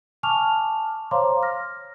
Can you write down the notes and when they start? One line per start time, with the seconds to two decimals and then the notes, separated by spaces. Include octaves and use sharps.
0.23 G#5 A5 C#6 D6 F6 F7
1.11 C5 C#5 F5 A#5 C6 D6
1.42 F6 A#6